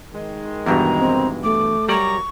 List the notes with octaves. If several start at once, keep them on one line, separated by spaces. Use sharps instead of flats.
D#3 G#3
E2 G2 B2 A#5
C4
A3 D6
F#2 G3 D5 A#5 C#6